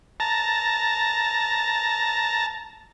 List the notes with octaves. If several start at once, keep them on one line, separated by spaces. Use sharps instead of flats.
A5 A#5